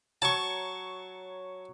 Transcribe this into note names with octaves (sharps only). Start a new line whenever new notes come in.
F#3 C#5 A5 C#6